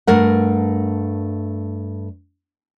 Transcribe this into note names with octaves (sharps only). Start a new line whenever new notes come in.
G2 A3 A#4 F#5